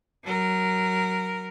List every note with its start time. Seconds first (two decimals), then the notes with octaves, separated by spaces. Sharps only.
0.24 F#3 A#4